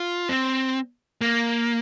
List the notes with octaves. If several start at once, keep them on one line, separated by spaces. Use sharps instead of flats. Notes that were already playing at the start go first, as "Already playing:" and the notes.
Already playing: F4
C4
A#3